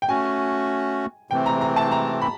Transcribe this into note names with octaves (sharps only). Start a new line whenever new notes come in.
G5
A3 C#4 F#4 G#5
C3 E3 A3 C4 G5
A#5
A#5
A5
A#5
B5